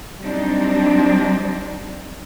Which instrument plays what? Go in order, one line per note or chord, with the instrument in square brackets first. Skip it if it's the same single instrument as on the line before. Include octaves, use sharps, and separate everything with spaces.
[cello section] F#3 G3 C4 D4 D#4